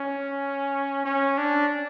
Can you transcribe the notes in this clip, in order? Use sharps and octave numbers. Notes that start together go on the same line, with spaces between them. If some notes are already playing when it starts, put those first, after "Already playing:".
Already playing: C#4
C#4
D4